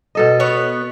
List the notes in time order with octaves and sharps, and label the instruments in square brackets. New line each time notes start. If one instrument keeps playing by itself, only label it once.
[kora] B2 A4 D#5
[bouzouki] B3 C#5